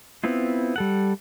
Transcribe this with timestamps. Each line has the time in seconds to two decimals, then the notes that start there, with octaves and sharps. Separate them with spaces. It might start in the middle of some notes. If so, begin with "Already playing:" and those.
0.24 B3 C4 E4 F4
0.76 G3 A4 F#5